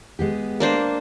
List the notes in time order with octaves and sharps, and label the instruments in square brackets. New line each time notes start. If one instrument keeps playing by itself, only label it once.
[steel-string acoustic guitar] G#3 B3 G4
[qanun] A#3 D4 C5